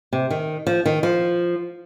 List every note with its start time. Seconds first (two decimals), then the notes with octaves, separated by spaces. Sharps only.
0.13 C3
0.30 D#3
0.67 F3
0.85 D#3
1.03 F3